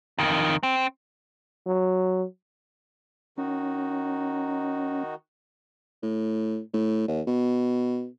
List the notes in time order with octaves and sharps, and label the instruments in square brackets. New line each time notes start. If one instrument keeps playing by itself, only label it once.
[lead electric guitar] F2 D#3
C4
[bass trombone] F#3
[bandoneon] D#3 D#4 F#4 [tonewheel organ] C#4
[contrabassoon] A2
A2
D#2
B2